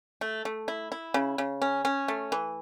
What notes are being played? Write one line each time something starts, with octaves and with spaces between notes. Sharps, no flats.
A3
A3
E4
E4
C#3
C#3
C#4
C#4
A3
E3